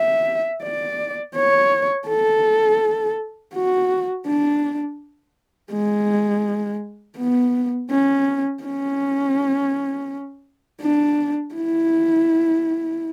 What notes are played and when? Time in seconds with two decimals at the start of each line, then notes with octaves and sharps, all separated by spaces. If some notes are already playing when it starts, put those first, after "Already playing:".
Already playing: E5
0.64 D5
1.36 C#5
2.08 A4
3.55 F#4
4.27 D4
5.72 G#3
7.18 B3
7.91 C#4
8.64 C#4
10.82 D4
11.55 E4